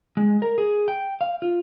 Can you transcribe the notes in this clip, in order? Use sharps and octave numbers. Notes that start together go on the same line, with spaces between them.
G#3
A#4
G#4
G5
F5
F4